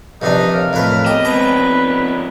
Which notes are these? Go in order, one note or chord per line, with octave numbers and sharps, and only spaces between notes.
A#1 C3 D4 D#4 B4 D#5
A#4 C#5 D#5 F5
F2 A2 B4
B3 C4 G4 D#5
F3 G#3 B4 A#5